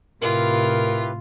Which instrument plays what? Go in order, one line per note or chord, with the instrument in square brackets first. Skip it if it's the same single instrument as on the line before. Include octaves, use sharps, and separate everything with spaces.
[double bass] A2 C3 [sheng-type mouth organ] E4 G4 B4 [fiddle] F4 [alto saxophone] A#4